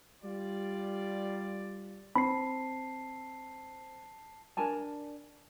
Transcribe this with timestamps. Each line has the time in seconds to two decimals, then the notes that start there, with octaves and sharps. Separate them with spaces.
0.22 G3 F4 D5
2.16 C4 A5 B5 C7
4.57 D4 A#4 G#5 A5